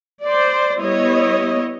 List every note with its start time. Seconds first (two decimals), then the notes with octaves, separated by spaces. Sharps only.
0.24 C5 D5
0.79 G3 B3 E4 C#5 D#5